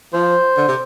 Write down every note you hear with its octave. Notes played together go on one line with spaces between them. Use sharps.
F3 C5
D3
C3